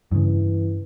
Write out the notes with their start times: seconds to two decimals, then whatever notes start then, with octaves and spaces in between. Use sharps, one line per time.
0.11 G2 C#3 E3